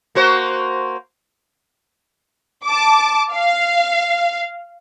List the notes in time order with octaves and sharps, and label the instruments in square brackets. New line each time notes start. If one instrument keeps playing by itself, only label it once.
[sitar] A#3 F#4 C5
[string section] A5 D6
F5